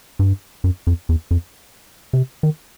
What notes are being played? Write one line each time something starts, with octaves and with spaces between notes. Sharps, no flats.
G2
F#2
F2
E2
F2
C3
D#3